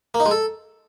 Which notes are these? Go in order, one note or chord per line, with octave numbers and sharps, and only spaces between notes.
A#3
D#4
G#3
A4